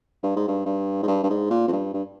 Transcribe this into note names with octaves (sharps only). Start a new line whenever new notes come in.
G2
G#2
G2
G2
G#2
G2
G2
G#2
A#2
F2
G2
G2